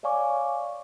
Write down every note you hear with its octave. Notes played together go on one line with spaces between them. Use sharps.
C#5 D5 F5 G#5 C#6 D6